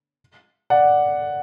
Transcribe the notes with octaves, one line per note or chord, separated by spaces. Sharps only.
D5 F#5